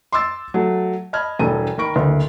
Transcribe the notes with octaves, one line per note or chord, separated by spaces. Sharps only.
C6 D6 E6 A6
F#3 A3
D#5 A5 B5 F6 G#6
E1 G2 A4 D#7
D#3 A#4 B5 C#6 D7
F#1 D2